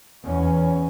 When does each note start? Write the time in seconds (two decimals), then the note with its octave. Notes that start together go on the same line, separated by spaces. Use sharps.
0.24 E2 C#4